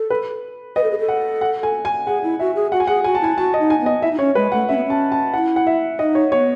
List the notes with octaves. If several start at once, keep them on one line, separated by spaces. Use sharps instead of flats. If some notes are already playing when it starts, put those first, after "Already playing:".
Already playing: A4
B4
B4 D#5
A4
G#4
A4
F#5
F#5
G#5
G#5
G#4 F#5
E4
F#4 E5
G#4
F#4 F#5
G#5
G#4 F#5
F#4 G#5
A5
E4 G#5
F#4 A5
D#5
D#4
G#5
B3
D#5
E4 E5
D#4
C#4 C#5
G#3 B4
A3 F#5
C#4 E5
B3
C#4 A5
A5
E4 F#5
F#5
E5
D#4 D#5
C#5
B3 C#5